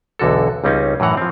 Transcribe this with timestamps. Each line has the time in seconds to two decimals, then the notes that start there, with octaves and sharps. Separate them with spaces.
0.19 B1 E2 D3 F#4 A4
0.64 C#2 G3 C4 C#4 D#4
1.00 F#2 A2 E3 F#5 A#5
1.17 F3 C4